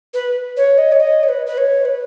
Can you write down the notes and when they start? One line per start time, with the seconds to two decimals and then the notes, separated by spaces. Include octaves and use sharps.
0.14 B4
0.57 C#5
0.78 D#5
0.92 C#5
1.00 D#5
1.23 C#5
1.28 B4
1.46 B4
1.58 C#5
1.85 B4